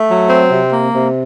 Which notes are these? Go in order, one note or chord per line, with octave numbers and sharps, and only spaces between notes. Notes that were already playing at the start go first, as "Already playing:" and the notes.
Already playing: A3
F#3
C4
C3
A#3
C3